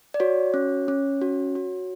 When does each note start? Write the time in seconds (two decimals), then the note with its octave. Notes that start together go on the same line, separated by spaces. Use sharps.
0.14 D5
0.20 F#4 C#5
0.54 C#4
0.88 C#4
1.22 F#4
1.55 F#4